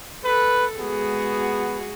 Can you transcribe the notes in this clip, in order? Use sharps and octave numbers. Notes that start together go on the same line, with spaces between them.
A4 B4
G#3 B3 F#4 G#4